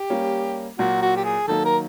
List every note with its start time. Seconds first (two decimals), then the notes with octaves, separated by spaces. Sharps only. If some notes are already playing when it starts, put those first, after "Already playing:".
Already playing: G4
0.10 G3 A#3 C#4
0.79 A#2 F#3 A#3 F#4
1.02 F#4
1.16 G4
1.24 G#4
1.48 D#3 F#3 A#3 D#4 A4
1.65 A#4